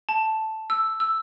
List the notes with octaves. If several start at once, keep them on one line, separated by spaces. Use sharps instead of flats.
A5
E6
E6